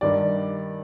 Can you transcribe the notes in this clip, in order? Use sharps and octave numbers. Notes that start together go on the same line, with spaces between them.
G2 D#3 G3 D5